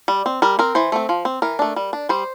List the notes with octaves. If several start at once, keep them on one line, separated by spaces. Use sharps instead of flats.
G3
C4
G3 A#4
C4 A#4
E3 C5
A3 C4
F3
C4
E3 A#4
A3 D4
G3
D4
G3 C5